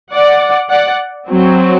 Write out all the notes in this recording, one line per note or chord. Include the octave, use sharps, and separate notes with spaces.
D5 F#5
D5 F#5
F#3 C4